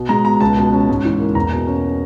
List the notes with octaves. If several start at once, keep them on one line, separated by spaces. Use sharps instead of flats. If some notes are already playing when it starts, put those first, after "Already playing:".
Already playing: B2
G#3 A#5
B2 A#5
C#2 A5
B2
C#4
G#2
E3
A#3
E2 A#5
B2
C#4